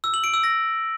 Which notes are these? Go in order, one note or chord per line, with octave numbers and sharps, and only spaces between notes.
E6
F#7
D7
E6
A#6